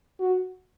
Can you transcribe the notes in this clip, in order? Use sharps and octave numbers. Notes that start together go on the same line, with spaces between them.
F#4